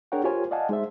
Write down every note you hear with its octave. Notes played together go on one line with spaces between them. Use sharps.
D4 G#4 A#4 C#5 F#5 G5
F4 G4 A#4 C5 C#5 G#5
D5 D#5 F5 F#5 G#5 A5
G#3 D#4 G#4 C5 E5